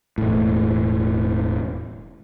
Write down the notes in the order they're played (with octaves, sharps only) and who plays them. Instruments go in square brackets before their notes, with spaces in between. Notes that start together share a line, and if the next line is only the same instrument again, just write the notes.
[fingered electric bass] E1 A2